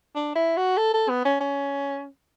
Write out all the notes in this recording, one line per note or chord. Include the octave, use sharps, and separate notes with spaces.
D4
E4
F#4
A4
A4
B3
C#4
C#4